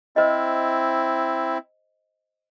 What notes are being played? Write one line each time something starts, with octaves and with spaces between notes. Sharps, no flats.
C4 E4 C5 D#5